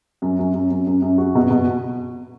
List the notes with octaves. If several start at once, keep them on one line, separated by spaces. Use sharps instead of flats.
F#2
F#2
F#2
F#2
F#2
F#2
F#4
B2
B2